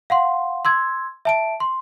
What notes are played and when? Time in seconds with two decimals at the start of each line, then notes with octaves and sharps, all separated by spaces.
0.10 F5 F#5 C6
0.65 C6 E6 G#6
1.25 E5 A5 D7
1.60 C6